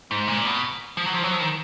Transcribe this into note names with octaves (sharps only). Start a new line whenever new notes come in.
G#2
A#2
B2
F3
F#3
F3
F#3
F3
D#3